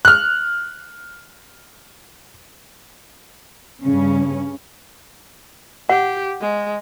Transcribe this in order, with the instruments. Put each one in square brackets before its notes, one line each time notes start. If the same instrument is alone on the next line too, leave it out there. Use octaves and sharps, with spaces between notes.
[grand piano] F6 F#6
[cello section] G2 C#3 C#4
[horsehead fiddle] G4 [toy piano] F#5
[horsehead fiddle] G#3